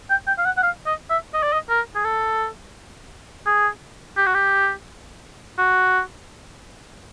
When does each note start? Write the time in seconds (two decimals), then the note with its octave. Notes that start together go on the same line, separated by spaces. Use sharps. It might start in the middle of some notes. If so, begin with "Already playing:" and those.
0.10 G5
0.27 G5
0.38 F5
0.45 F#5
0.57 F#5
0.63 F5
0.86 D#5
1.10 E5
1.34 D#5
1.43 D5
1.53 D#5
1.69 A#4
1.95 G#4
2.04 A4
3.46 G#4
4.17 G4
4.26 F#4
4.34 G4
5.58 F#4